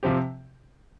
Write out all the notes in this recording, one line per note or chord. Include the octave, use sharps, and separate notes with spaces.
C3 F3 C4 G4